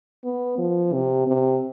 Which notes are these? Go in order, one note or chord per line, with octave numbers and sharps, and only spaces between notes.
B3
F3
C3
C3